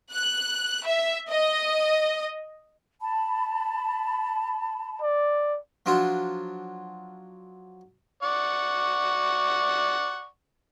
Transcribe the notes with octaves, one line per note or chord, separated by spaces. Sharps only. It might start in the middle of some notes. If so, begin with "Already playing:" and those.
F#6
E5
D#5
A5 B5
D5
F3 F#3 D4 F4
D5 F#5 C#6